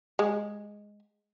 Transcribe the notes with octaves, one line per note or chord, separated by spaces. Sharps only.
G#3